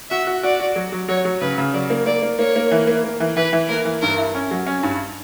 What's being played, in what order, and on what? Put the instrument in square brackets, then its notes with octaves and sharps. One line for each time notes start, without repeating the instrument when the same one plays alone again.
[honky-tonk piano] F#4 [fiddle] E5
[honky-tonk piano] F#4
[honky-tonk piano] F#4 [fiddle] D5
[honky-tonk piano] F#4
F#3
F#3
[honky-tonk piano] F#3 [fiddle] C#5
[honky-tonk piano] F#3
[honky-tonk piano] C#3 [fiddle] B4
[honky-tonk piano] C#3
[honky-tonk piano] F#3 [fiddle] D5
[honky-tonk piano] A#3
[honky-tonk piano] A#3 [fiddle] D5
[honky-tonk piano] A#3
[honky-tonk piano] A#3 [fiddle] C#5
[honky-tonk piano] A#3
E3
A#3
A#3
E3
[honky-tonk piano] E3 [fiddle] B4
[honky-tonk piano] E3
[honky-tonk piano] A#3 [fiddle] A#4
[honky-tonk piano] E3
[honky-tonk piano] G2 [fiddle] A#4
[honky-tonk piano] E4
C#4
F#3
C#4
G2